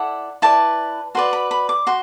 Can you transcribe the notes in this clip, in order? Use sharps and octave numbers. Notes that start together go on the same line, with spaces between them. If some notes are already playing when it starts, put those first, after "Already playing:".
Already playing: E4 A4 D5 F#5
E4 B4 D5 A5
F#4 B4 D5 C6
B5
B5
D6
F#4 C6